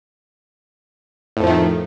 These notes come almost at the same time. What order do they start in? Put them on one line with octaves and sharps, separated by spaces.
A2 F2 F3 A3 D#3